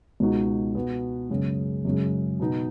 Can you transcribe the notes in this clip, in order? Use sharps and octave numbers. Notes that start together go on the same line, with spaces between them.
C#2 B2 G#3 D#4 F#4
B2 B3 F#4
F#2 C#3 G#3
F#2 C#3 G#3
B2 B3 D#4